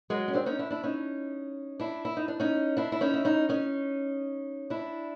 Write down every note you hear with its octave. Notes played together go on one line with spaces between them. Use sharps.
F#3 G#3
C#4
C4 D4
C#4 D#4
D4 E4
D4 E4
C#4 D#4
D4 E4
E4
D#4
D4
C#4 D#4
D4 E4
E4
C#4 D#4
E4
C#4 D#4
C#4 D#4
D4 E4